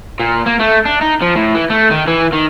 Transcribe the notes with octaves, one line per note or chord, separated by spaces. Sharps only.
A#2
A#3
A3
D4
D#4
F3
A2
E3
A3
D#3
E3
D#3